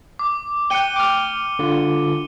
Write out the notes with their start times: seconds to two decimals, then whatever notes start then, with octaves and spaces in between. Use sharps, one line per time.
0.19 D6
0.70 G5 F#6 C#7 D#7 G7
0.96 D6 F6
1.59 D3 F4